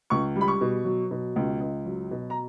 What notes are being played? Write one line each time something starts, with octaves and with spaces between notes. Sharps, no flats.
C#2 C#6
G3
B5
C#6
B2
F#3
B2
C#2
C#2
F#3
B2
A#5